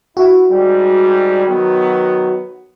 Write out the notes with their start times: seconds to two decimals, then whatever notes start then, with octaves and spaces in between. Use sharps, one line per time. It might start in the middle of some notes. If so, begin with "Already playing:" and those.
0.17 E4 F#4
0.51 G#2 G3
1.46 D#3 F#3 B3